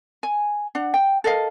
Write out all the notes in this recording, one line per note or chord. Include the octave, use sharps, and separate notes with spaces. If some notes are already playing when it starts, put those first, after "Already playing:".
G#5
D4 F#5
G5
A4 A#4 D#5 F5